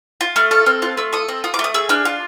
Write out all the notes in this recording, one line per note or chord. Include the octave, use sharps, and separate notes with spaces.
F4
A3 F6
A4 F6
C4 F6
F4 F#6
A3 E6
A4 D#6
C4
F4 D#6
D6
A3
D#6
G#4 E6
D4 F6
F4